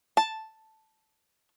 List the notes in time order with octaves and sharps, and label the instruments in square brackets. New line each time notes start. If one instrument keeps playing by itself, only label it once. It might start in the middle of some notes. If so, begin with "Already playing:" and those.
[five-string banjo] A5